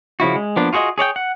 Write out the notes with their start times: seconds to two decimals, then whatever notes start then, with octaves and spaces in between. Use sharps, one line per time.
0.20 C#3 F3 E4 F#4
0.36 G#3
0.56 F3 A#3 B3 D4
0.73 F4 F#4 G#4 C5 D#5
0.98 G#4 C#5 D5 G5
1.16 F#5